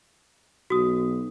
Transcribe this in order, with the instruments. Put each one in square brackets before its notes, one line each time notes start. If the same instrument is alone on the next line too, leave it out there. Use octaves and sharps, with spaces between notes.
[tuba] B1 [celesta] F#4 D#6